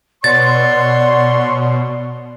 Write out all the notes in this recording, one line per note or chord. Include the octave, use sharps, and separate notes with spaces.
B2 C#5 D5 F#5 C6 A6